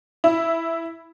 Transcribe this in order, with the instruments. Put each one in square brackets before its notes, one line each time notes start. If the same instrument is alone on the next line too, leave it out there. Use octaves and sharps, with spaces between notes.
[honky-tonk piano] E4